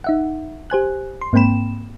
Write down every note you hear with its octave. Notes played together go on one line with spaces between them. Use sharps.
D#4 E5 F#5
G4 C5 G#5 F#6
C6
G#2 A#3 C4 G5 B5 E7